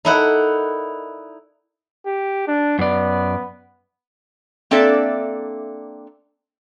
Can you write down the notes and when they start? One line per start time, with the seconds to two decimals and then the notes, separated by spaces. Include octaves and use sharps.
0.05 D#4 E4 A4 A#4 D5 F#5
2.06 G4
2.47 D4
2.79 F#2 B3 D5
4.71 A#3 C4 D4 A4 D5 E5